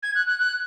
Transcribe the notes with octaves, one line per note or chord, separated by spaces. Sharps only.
G#6
F#6
F#6
F#6